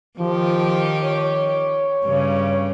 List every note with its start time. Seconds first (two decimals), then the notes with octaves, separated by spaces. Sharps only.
0.19 D#3 F3 G4
1.03 C#5
2.04 G2 C#3